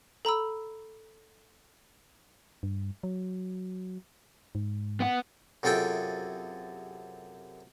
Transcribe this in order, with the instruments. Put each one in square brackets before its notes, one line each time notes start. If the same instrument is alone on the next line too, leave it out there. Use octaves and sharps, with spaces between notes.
[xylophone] A4 A#5 B5 E6
[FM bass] G2
F#3
G#2
[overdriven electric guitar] B3 F#5
[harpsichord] F#2 C3 F4 G#4 A4 G5